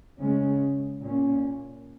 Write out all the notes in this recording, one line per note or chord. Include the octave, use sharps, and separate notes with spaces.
C#3 G#3 C#4
A#2 A#3 C#4